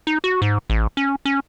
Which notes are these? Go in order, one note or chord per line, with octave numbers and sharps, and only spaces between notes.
D#4
F#4
G#2
A1
C#4
C#4